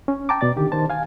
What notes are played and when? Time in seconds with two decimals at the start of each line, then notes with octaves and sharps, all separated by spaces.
0.08 C#4
0.29 G5 A5 A#5 D6
0.41 B2 D5 A6
0.56 D3 D#3 G4
0.72 D#3 C5 A5
0.90 F5 G#5